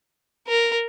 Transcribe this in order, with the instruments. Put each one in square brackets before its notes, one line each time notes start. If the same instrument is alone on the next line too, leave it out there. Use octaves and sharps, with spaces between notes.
[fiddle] A#4